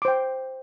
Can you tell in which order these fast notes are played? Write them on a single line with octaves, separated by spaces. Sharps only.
D6 C5 G5